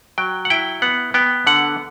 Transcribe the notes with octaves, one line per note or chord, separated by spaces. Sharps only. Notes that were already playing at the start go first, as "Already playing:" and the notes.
F#3 G5
F#5
E4 G5
B3 F#5
B3 G5
D3 F#5